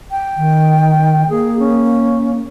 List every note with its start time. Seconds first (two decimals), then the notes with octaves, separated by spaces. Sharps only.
0.11 G5
0.37 D#3
1.30 A#3 G#4
1.59 C#4